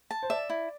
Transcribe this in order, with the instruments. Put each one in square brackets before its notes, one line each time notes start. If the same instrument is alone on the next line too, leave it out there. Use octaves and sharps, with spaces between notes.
[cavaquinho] A5
[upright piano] C5
[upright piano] D5 [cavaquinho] E5
[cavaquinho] E4